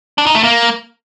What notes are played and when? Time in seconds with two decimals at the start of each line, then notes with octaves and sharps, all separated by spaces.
0.18 D4
0.26 D#4
0.35 A3
0.43 A#3